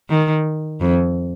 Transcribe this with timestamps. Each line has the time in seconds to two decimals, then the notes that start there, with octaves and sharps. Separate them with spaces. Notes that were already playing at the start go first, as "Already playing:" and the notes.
0.09 D#3
0.81 F2